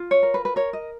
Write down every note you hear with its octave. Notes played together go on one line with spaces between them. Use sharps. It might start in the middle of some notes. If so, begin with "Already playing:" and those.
Already playing: F4
C#5
A#4
B4
B4
A#4 C#5
D#5